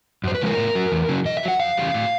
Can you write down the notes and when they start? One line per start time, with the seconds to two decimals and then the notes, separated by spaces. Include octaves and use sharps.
0.24 F#2 C5
0.35 B4
0.41 C#3 F3 G#3 A#4
0.57 A2
0.75 F#3
0.92 E2
1.09 C#3 F#3
1.25 B2 D#5
1.37 E5
1.43 F#3 F#5
1.60 F2 F5
1.77 C#3 E3 G3
1.94 A2